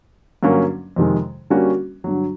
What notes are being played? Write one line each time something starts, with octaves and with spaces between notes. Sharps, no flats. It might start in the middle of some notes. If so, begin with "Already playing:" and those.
G2 D3 F#3 A#3 C#4
F2 C3 D#3 G#3
D3 G3 A#3 C#4 F#4
G2 D3 F#3